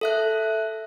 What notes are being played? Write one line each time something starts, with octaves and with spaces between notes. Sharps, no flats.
A4 E5 F#6